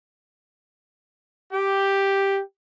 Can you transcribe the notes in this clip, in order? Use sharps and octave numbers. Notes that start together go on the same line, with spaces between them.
G4